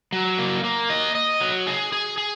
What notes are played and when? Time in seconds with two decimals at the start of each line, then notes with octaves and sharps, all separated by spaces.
0.12 F#3
0.38 A#3
0.64 A#3
0.90 D#5
1.15 D#5
1.41 F#3
1.67 G#4
1.92 G#4
2.18 G#4